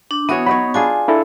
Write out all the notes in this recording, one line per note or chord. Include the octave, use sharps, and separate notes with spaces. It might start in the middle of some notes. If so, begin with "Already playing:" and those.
D4
E3 B3 F#4 C#5 D#6
F#3 D#4 C#5 B5
D4 F4 G#4 G#5
D4 E4 A4